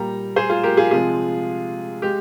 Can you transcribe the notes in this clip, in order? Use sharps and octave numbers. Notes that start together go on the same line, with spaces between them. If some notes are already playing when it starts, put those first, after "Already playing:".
Already playing: A#2 G3 A#3 G5 A#5
G#4 C5
F4 G#4
G4 A#4
F4 G#4
C3 F3 G#3 F4 G#4
G#3 G4